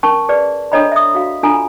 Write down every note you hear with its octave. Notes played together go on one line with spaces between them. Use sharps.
C#4 A#4 A5 C#6
G#4 B4 D5
D4 A4 C#5 D#5 A#5 B5
E5 D#6
F#4 F5
D4 F4 A4 G#5 A#5